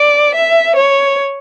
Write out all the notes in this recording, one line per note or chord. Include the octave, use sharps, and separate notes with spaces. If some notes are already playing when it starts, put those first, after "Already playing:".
Already playing: D5
E5
C#5